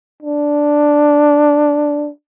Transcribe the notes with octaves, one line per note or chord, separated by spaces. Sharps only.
D4